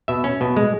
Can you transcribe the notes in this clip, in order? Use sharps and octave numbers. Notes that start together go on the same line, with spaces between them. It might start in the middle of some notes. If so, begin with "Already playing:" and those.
B2 E5
C#4
B2
G#3